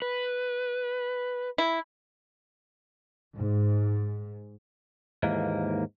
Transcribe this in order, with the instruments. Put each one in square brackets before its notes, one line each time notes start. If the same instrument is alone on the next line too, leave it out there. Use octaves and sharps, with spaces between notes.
[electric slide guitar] B4
[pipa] E4
[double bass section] G#2
[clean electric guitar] D#2 G#2 E3 A#3